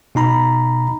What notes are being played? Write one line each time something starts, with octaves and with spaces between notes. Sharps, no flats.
B2 D#4 A#5 B5